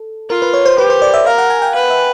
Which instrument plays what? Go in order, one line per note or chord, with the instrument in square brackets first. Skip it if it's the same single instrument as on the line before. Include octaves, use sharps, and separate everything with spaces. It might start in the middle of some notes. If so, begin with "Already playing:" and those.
Already playing: [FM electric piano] A4
[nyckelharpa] F4 [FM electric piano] A#4
[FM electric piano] B4
C#5
C5
[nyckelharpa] G4 [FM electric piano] B4
[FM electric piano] C5
D5
E5
[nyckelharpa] A#4 [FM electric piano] F5
[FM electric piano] F#5
G#5
G5
[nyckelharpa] B4 [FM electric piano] F5
[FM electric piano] E5